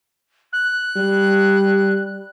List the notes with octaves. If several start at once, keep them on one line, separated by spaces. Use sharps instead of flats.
F#6
G3